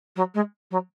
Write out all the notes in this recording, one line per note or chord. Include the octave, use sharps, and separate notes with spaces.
F#3
G#3
F#3